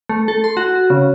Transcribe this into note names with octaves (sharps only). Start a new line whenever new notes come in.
A3
A4
C6
F#4
C#3